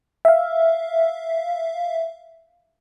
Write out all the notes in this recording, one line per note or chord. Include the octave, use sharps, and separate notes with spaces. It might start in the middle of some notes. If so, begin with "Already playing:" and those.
E5 F5